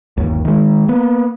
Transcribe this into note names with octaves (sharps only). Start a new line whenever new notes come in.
G1 D#2
D#3 G#3
A#3 B3